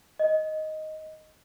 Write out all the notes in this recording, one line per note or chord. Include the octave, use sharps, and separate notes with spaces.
D#5